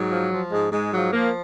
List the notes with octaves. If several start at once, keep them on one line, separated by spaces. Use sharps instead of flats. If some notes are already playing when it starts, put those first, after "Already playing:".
Already playing: G#2 F#3
F3
F3
G#2 G#3
G#2 G#3
F3 F#3
F3 A#3